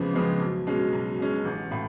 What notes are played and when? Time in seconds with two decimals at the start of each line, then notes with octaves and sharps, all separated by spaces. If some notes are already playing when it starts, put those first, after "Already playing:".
Already playing: F2 C#3 F3 G#3 B3
0.13 C#3 F3 G#3 B3
0.40 B1
0.67 B2 G#3 C#4
0.93 B1
1.19 B2 G#3 C#4
1.45 A1
1.71 A2